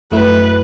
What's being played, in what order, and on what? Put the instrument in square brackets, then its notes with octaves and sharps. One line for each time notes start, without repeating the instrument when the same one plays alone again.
[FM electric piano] F#2 F#3 A3 E4 [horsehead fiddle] B4